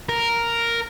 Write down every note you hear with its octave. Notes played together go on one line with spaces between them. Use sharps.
A#4